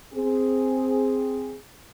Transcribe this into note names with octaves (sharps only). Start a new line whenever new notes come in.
C4 G#4